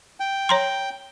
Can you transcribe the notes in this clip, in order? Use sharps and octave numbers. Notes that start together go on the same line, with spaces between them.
G5
C#5 A#5 C6